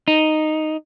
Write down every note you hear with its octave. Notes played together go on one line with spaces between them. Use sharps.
D#4